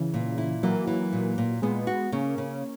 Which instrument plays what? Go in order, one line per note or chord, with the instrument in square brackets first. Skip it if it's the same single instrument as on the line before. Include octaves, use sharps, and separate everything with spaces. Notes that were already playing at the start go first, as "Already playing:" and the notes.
Already playing: [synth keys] C#3 E3
[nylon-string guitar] A#2
E4
[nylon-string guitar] E3 [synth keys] F#3 A#3
[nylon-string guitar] E3
A#2
A#2
[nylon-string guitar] A#2 [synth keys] G#3 B3
[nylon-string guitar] F#4
[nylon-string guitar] C#3 [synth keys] A#3 C#4
[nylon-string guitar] C#3